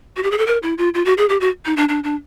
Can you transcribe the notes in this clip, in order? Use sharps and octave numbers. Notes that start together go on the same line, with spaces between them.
F#4
G4
G#4
A4
A#4
E4
F4
F4
F#4
G#4
G4
F#4
D#4
D4
D4
D4